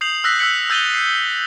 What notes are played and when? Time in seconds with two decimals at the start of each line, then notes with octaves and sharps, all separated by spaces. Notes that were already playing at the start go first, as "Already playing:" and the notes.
0.01 D#6 G6 C7 F7 F#7
0.24 D#6 E6 F#6 A#6 B6
0.39 E6 F#6 G6 B6 C#7 F#7
0.70 E6 G6 A6 D#7 F7 G7
0.94 C7